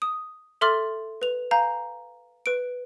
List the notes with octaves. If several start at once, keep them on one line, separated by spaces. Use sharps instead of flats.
D#6
A4 E5 C6 D6 F6 A6
B4 F7
F5 G#5 A#5 G6
B4 D7